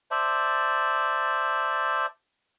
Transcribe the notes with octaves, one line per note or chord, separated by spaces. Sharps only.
C5 D5 E5 A5